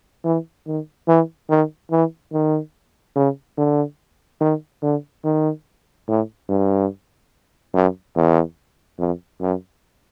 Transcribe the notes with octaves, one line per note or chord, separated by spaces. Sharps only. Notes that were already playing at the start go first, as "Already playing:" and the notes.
E3
D#3
E3
D#3
E3
D#3
C#3
D3
D#3
D3
D#3
A2
G2
F#2
E2
F2
F#2